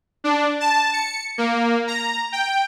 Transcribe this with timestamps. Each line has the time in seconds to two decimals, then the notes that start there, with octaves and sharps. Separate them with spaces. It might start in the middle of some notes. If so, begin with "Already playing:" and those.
0.24 D4
0.60 A5
0.93 C#7
1.38 A#3
1.87 A#5
2.32 G5